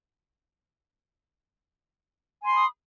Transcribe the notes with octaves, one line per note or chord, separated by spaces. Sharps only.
G#5 B5 C6 D#6